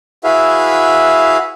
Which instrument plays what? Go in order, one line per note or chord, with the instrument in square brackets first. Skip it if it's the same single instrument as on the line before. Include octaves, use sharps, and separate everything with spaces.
[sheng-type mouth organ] E4 F#4 G#4 B4 E5 F5